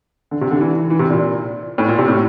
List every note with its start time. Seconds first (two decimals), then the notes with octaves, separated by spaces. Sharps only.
0.31 D3
0.41 C3
0.51 D3
0.60 E3
0.90 E3
0.99 C3
1.10 A#2
1.78 A2
1.88 A#2
1.99 C3
2.08 A2